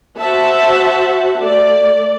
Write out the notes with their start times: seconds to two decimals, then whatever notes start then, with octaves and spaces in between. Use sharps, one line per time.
0.18 F#4 C5 E5 F#5 A5
1.39 A3 D5